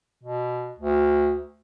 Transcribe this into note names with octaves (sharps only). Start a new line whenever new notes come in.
B2
D2